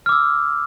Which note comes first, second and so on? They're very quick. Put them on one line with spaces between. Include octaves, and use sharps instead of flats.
F6 D6 E6